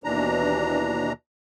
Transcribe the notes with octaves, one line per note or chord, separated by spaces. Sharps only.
D#2 B2 E3 D4 A#5